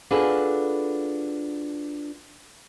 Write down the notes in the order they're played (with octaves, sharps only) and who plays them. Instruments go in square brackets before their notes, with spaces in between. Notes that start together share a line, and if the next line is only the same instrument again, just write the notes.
[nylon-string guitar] D4 F4 F#4 G#4 A4 B4